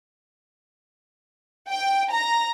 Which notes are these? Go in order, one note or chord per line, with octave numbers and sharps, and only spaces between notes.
G5
A#5